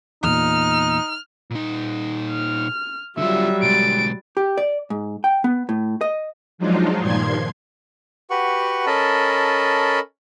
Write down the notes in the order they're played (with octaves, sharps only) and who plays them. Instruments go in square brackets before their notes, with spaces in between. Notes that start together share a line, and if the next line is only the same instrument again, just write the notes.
[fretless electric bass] E2 A#2 [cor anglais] D#4 [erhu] F6
[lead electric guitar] A#2 D#4
[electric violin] F6
[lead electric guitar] D3 F4 [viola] F#3 G3 [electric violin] E5
[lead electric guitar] B1 G#3 [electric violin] A6 D7
[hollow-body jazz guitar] G4
D5
G#2
G5
B3
A2
D#5
[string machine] F3 F#3 G#3 D4 D#4 F4
G2 A#2 D#3 F3 C6 G#6
[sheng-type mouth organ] F#4 G4 B4 F#5 C#6
C#4 A4 A#4 D#5 A5 B5